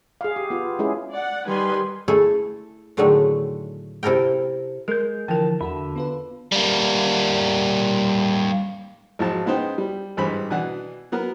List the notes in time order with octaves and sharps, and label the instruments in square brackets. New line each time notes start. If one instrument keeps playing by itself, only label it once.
[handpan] G#4 F5
G4
B3 F4
G#3 C#4 E4 G#4
[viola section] D5 F#5
D#3 G3 B4 G#5 C6
[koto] A3 E4 G#4 A4
A2 D3 D#3 F#3 G#3 A3
C3 E4 A4 A#4 G5
[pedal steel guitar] G#3 G6 [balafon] A#4
[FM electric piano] D3 E3 F3 [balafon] A#4 G5 [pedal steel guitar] A5
[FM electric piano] E2 F#4 [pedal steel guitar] D3 E5 B5
[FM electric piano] B3 F4 B4
[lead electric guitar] G3 A#3
[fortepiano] G#1 F3 F#3 A5
C#3 G#3 B3 D#4 C5 G5
G3
G#1 G2 E3 C5 B5
B2 E3 D4 F#5
F#3 B3 A#4